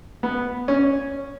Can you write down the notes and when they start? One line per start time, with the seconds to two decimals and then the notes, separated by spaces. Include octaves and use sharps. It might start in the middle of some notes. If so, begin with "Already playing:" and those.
0.23 B3
0.68 C#4